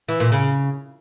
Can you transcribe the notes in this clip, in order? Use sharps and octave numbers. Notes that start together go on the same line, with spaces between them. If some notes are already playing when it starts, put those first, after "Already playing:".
E3
A#2
C#3